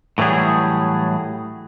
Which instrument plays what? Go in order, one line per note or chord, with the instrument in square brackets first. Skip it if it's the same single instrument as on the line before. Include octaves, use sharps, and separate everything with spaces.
[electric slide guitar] A2 E3 F#3 G3 G#4